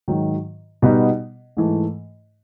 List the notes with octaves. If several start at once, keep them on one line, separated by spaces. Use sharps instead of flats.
G#2 D#3 F#3
B2 G3 B3 D#4
G#2 E3 A3